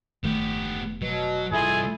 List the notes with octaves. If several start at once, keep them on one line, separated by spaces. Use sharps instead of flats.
F1 D#3 A3 B3 G4
B2 F#3
C2 E4 F4 G#4 A4 D#5